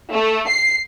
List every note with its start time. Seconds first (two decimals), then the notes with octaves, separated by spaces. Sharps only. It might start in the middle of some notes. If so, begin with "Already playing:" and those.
0.13 A3
0.48 C7